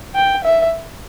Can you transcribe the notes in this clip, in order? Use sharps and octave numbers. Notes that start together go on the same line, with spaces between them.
G5
E5